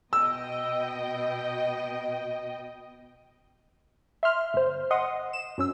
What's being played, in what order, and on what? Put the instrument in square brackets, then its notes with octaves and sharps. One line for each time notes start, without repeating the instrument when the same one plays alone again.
[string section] B2 D#5 G5 [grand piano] E6
[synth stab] E5 C6 F6
G1 C5
D#5 F#5 C6 D#6
E7
F#2 C#4 E6